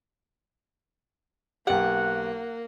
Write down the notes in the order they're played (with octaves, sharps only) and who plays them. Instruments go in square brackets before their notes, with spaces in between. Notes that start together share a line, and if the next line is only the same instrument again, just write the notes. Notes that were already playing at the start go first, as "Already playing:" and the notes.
[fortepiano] B1 G4 [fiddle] A#3 [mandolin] F#5